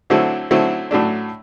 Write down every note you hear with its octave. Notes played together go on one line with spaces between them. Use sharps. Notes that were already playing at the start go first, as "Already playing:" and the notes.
D3 F#3 A3 C4 E4
D3 F#3 A3 C4 E4
A2 F#3 A3 D4